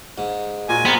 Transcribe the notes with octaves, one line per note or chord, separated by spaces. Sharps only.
G#2
A#2 F#4 G#5
B3 C4 A#4